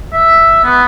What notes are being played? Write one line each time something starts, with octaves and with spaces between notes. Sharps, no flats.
E5
B3